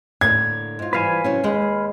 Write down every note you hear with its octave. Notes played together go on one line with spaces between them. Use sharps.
A2 D3 A#3 G#6
G#2 F4
E3 F3 G3 B4 F5 G#5
C3 F#3 C#4
D#2 G#3 G5